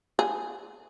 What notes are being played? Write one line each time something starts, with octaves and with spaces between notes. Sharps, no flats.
G#4